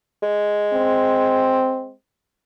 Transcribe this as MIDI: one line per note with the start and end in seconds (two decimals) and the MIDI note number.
0.23 1.94 56
0.74 1.93 60